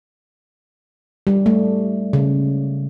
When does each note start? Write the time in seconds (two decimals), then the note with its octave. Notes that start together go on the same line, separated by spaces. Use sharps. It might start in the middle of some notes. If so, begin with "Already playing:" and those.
1.27 G3
1.46 A3
2.13 C#3